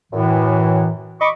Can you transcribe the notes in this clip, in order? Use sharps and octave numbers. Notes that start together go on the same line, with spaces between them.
F#2 A2 E3
D#5 B5 C#6 D6